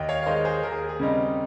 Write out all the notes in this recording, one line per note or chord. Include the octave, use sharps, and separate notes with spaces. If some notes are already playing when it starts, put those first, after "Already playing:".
Already playing: D#2 D#5 G5
C#5 F5
F5
D#3 G#3 C5 D#5
G#4 C5
D#2 A#4
G#4
G#4
C#3 G3 C4 D#4